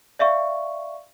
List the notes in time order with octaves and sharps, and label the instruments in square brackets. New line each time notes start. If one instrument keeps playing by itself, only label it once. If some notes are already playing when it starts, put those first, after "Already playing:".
[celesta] D5 E5 F5 C#6